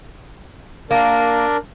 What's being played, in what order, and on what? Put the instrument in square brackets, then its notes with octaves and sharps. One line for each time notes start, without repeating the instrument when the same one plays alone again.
[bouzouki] A#3 [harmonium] D4 A#4 D5